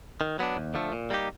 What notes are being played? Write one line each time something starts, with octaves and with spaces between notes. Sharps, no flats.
D#3
F#3 B3 D4
D#2
D3 F3 A3
A#2
G3 A#3 D#4 G4